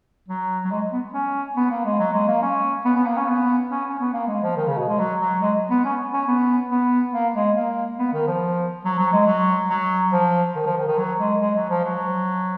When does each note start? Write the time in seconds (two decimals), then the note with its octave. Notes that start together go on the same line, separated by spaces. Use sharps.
0.28 F#3
0.65 F#3
0.71 G#3
0.92 B3
1.14 C#4
1.56 B3
1.71 A#3
1.85 G#3
1.99 F#3
2.13 G#3
2.27 A#3
2.42 C#4
2.85 B3
2.96 B3
3.06 A#3
3.17 C#4
3.28 B3
3.71 C#4
3.85 C#4
3.99 B3
4.13 A#3
4.28 G#3
4.42 F3
4.56 D#3
4.67 C#3
4.78 B2
4.89 G#3
4.99 F#3
5.21 F#3
5.42 G#3
5.70 B3
5.84 C#4
6.13 C#4
6.27 B3
6.70 B3
7.13 A#3
7.34 G#3
7.56 A#3
7.99 B3
8.13 D#3
8.27 F3
8.85 F#3
8.99 F#3
9.13 G#3
9.27 F#3
9.70 F#3
10.13 F3
10.55 D#3
10.66 F3
10.77 D#3
10.88 D#3
10.98 F#3
11.20 G#3
11.41 G#3
11.55 F#3
11.69 F3
11.84 F#3